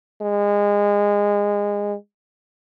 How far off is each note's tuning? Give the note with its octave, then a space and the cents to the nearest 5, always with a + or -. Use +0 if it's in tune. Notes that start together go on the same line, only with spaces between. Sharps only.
G#3 -25